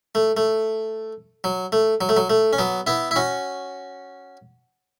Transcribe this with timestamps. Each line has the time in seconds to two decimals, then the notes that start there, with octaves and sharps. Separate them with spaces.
0.15 A3
0.37 A3
1.44 F#3
1.72 A3
2.01 F#3
2.09 A3
2.17 F#3
2.30 A3
2.53 C#4
2.58 F#3 B3
2.87 B3 E4
3.11 E4
3.16 C#4 F#4